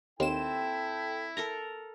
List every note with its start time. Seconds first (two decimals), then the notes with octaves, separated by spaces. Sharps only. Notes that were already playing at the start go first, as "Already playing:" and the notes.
0.20 D#2 C4 E4 A4 G5 E7
1.37 A4 A#4 A#5